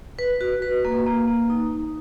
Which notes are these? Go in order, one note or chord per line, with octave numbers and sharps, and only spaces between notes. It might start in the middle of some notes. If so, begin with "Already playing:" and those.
B4
F#4
B4
A#3
A#3
A#3
D#4
D#4